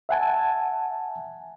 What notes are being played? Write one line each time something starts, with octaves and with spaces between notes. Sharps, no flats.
E5 F#5 G#5 A5